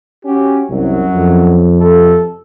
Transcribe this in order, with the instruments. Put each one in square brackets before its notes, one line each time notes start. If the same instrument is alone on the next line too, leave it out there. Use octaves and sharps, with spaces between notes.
[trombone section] C#4 F#4 G4
[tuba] C2 [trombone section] F#2 F#3
[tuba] F2
[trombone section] C3 A4